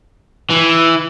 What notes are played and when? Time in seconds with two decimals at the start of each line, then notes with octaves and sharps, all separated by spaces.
0.50 E3